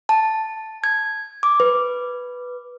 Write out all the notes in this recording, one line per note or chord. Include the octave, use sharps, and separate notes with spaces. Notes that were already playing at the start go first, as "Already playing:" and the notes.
A5
G#6
D6
B4